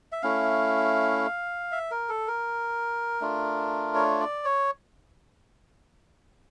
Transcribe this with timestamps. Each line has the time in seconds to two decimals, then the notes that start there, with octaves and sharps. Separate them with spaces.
0.12 E5
0.23 A3 C#4 E4 F5
1.72 E5
1.91 A#4
2.09 A4
2.28 A#4
3.21 A3 D4 F4
3.95 C#5
4.20 D5
4.45 C#5